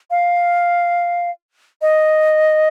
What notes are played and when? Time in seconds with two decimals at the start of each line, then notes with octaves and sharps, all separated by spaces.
0.11 F5
1.82 D#5